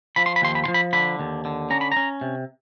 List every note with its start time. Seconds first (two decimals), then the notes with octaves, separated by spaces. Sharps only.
0.16 F3 B5
0.26 C6
0.36 B5
0.42 D#2 C6
0.55 B5
0.64 C6
0.68 F3
0.74 B5
0.93 D3 B5
1.20 D#2
1.45 D3
1.70 C#4 A#5
1.81 B5
1.92 C#4 A#5
2.21 C3